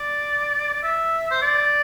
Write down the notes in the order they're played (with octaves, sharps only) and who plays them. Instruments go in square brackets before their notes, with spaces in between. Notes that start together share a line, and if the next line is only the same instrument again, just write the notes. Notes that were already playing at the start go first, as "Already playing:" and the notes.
Already playing: [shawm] D5
D5
E5
C5
D5